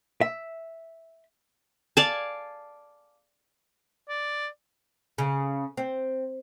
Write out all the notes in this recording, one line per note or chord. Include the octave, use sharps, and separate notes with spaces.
E5
D5 F5 G#5 A5
D5
C#3
C4